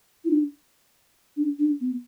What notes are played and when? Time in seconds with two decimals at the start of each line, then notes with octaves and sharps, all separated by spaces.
0.25 E4
0.30 D4
1.37 D4
1.59 D4
1.81 B3